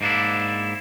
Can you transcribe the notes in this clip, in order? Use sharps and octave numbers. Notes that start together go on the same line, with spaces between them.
G#2 A#3 D4 E4